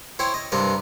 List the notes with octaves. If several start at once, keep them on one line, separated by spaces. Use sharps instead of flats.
E4 C5 C#5 G5
D#5
G2 C3 C4 A#4 B4